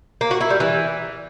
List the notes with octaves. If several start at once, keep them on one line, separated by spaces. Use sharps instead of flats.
A#3
F#4
E4
G3
E3